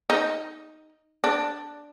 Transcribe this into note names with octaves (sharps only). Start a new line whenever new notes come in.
D#4
D4